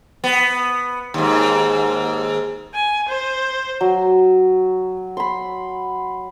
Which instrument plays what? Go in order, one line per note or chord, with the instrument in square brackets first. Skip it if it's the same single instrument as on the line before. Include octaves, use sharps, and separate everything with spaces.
[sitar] B3
D#2 G#2
[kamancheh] G#5
C5
[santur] F#3
B5 C6